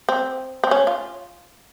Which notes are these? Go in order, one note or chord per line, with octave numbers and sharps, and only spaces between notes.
C4
C4
C#4
F4